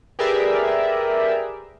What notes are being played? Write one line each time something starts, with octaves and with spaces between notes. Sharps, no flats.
G4 G#4 A#4 B4 D5 E5